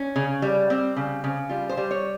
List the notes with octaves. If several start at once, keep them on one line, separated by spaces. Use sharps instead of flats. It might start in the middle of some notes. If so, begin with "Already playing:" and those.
Already playing: C#4
C#3
G3
G3 C4
C#3
C#3
G3 F4
C5
G3
C#5